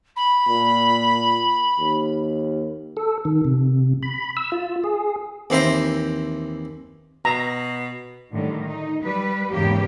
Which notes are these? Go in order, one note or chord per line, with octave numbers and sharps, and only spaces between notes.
B5
A#2
D#2
A4
D#3
C3
B5
E6
F4
G#4
D#2 E3 C4 C5 E5 A#5
B2 A#5
A2 D3 D#3 G3
D#4
G3 B4
E2 G#2 C#3 E3 A#3 G4